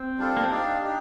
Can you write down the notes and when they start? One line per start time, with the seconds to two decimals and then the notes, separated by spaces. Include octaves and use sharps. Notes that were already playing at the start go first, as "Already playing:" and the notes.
Already playing: C4
0.18 G3 D4 F4 A4
0.37 A#3
0.44 C4
0.51 D4 D#4 G4 D5 F5
0.84 D#4 G4